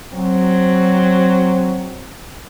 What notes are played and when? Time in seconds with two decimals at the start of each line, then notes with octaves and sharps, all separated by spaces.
0.13 F#3 C4